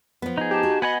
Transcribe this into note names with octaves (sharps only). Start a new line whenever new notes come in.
F3 B3
D#4 G#4
G4 A5
F#4
B3 D#5 F#5 G#5 B5